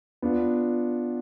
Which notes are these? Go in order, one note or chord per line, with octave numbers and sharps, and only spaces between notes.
B3 D4 F4